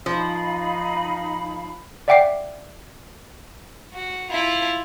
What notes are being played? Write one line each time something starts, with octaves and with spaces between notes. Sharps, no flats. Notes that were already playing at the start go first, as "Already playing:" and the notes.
F3 D#4 F5 B5
D5 E5 F#5 G5 D6 C7
F#4
E4 F4